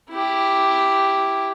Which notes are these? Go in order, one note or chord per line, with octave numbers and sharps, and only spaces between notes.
E4 G4